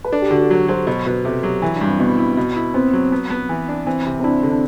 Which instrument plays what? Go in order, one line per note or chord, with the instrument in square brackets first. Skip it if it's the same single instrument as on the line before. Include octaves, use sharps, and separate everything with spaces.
[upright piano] B4
[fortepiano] D4 [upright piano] A4
[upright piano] G4
[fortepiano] D3 [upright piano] F#4
[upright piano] G4
[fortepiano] F#3 [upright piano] A4
[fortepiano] F#3 [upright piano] C5
[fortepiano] B2 [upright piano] C5
[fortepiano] B2 [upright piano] B4
[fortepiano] C3 [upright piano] A4
[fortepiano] F#3 [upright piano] G4
[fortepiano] E3 [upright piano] E4
[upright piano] D4
[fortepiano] G2
[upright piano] C4
[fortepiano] B2 [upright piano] B3
[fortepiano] E4
B2
E4
[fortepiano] B3 [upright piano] C4
[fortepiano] F#3
B3
B3
E3
D4
[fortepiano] E3 [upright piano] C4
[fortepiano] C3
[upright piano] C4
[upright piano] D4 [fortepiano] E4
[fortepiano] D3
[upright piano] D4